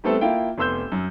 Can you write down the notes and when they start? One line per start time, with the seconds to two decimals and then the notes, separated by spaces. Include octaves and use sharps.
0.04 G3 A3 B3 C4 A4
0.21 A#3 E4 F4 G5
0.58 F1 B3 C6 E6 G6
0.92 F#2